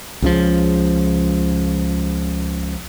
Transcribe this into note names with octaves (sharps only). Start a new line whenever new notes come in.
C#2 C#3 F3